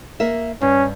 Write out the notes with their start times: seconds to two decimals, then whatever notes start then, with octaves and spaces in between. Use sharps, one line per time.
0.20 A#3 A#4 E5
0.61 G2 C#4